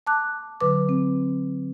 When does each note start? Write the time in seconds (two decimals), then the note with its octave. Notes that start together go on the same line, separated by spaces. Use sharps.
0.07 A5 D6 F#6
0.61 D3 F#3 B4 D6
0.89 C4